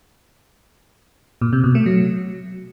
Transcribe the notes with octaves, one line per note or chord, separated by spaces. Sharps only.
A#2
C3
B2
A3
F#3